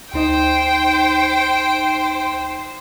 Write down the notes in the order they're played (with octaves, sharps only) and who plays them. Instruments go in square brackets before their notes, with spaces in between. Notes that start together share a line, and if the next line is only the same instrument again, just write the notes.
[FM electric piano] D2 D#4 D#5 [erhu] C5 [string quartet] G5